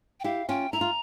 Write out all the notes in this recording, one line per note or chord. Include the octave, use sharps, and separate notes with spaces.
G5
E4 G4 F5
C#4 F4 G5
E4 A#5
F4